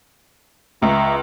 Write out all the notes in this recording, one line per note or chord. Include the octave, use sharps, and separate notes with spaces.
C#2 E5 A#5 C#6